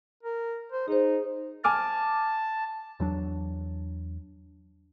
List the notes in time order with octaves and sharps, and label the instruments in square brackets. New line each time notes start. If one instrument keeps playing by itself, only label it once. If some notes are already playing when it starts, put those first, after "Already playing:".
[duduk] A#4
C5
[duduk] D#4 [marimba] G#4 C5
[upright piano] G#5 D6 F6 [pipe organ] A5
[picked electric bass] E2 F#3 D4